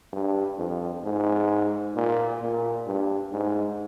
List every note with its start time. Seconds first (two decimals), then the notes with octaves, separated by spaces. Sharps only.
0.13 G2
0.58 F2
1.04 G#2
1.95 A#2
2.41 A#2
2.86 G2
3.32 G#2